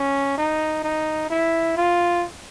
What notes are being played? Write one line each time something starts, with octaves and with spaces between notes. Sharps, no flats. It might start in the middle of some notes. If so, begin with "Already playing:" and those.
Already playing: C#4
D#4
D#4
E4
F4